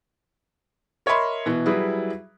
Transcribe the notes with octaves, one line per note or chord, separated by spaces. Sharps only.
A#4 C#5 D#5 E5 B5 C6
B2 E3
F#3 G3 E4 G#4 B4